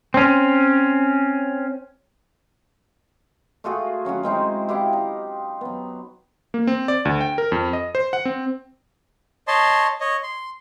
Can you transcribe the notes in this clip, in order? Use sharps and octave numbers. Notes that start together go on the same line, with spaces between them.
C4 C#4
A3 F4 F#4 G#4
F#3 C#4 F4 F#4
G#3 C4 D#4 E4
E4 G4 F5 F#5
D#4
F#3 B3
A#3
C4
D5
D2
G5
A#4
F2
D#5
C5
F#5
C4
C#5 D#5 A5 C6
C#5 D#5
C6